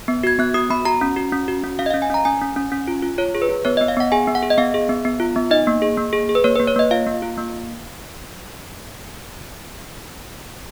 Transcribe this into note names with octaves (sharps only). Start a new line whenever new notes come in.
B3
F#4 G#6
B3 F#6
F#4 D#6
B3 B5
F#4 A#5
C#4
F#4
C#4
F#4
C#4
C#4 F5
D#5
C#4 F5
G#5
C#4 A#5
C#4 G#5
C#4
C#4
C#4
F4
F4
F4 C#5
G#4
B4
F4
B3 C#5
B3 D#5
F5
B3 F#5
G#4 G#5
B3
F#5
G#4
D#5
B3 F5
G#4
B3
B3
F4
B3
D#4 D#5
A#3
G#4
A#3
G#4
G#4
B4
A#3 C#5
A#3 B4
C#5
A#3 D#5
F4 F5
A#3
F4
A#3